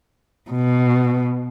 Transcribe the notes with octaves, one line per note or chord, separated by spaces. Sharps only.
B2